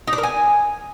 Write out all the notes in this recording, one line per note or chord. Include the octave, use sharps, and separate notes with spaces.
D#4
D4
A#4
G#5